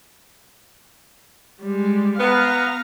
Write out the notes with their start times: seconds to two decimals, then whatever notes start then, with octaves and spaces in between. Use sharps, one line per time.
1.61 G3 G#3
2.19 B3 F5 A#5